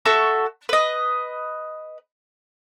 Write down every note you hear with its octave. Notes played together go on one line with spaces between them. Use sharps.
F#4 A4 E5 C#6
B4 D#5